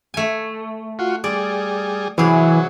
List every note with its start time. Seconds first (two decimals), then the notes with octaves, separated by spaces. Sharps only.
0.14 A3 G#5
0.99 F4 F#4
1.24 G3 G#4 D5
2.18 C3 E3 F#3 G#4